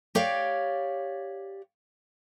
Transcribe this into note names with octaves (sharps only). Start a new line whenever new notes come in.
G4 C#5 D5 F5